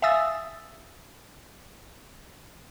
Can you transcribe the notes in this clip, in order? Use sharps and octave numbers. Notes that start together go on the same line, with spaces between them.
E5 F5 G#5 D#6 E6 A6